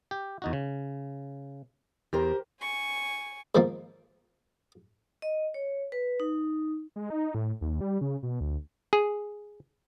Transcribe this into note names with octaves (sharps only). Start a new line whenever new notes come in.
G4
E2 D#4 F#4
C#3
E2 G4 A#4 C5
G#5 C#6
G#2 D#3 F3 A#3
D#5
C#5
B4
D#4
G#3
D#4
A2
D#2
G3
C#3
B2
D2
G#4